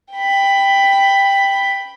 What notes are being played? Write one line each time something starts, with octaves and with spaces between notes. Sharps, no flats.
G5 B5